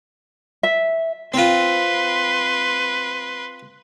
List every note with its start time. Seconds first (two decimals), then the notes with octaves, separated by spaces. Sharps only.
0.63 E5
1.34 C4 F4 B4 C6